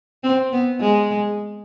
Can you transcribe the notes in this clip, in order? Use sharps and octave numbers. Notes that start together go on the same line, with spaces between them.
C4
B3
G#3